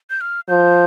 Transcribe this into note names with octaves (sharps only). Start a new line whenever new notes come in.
G6
F6
F3 G6